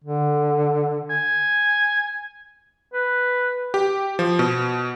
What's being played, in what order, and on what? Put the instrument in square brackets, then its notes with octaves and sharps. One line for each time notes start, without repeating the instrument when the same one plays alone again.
[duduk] D3
[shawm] G#5
[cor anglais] B4
[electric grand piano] G4
F3
B2